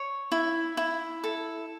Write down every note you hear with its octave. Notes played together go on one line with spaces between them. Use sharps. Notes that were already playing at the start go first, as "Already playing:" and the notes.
Already playing: C#5
E4
E4
A4